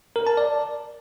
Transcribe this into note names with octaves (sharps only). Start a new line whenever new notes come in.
A#4
A5
D5